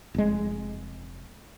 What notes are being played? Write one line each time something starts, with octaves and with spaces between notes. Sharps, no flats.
F1 G#3